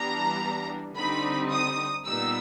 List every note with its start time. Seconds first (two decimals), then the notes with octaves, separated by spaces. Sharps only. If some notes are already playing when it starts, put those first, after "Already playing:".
Already playing: E3 G3 B3 D4 A#5
0.97 D3 G3 C4 D#4 B5
1.52 D#6
2.06 A#2 G3 B3 D#4 E6